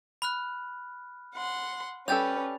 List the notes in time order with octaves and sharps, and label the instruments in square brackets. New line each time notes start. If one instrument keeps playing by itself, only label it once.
[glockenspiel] B5 F6 F#6
[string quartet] F#5 C6
[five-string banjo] G3 G4 A4 [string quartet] C#4 B4 [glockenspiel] A6 F7